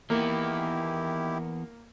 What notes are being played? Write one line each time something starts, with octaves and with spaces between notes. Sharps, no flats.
D#3 E3 A#3 B3 E4 G4